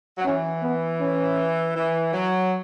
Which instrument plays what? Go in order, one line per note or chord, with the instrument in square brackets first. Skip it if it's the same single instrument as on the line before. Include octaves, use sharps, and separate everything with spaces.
[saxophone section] F#3
[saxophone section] E3 [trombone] C#4
[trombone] B3
C#4
[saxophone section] E3
F#3